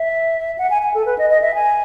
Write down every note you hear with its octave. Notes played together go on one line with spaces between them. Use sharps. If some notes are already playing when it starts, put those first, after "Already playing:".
Already playing: E5
F#5
G#5
G#5
A4
B4
D#5
D#5
E5
G#5